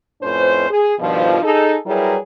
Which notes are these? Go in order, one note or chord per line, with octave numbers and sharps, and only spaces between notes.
F2 A2 C#4 B4 C5
G#4
G2 B2 D#3 F3
D#4 G#4 A4
F#3 G3 E4 G#4 A#4 B4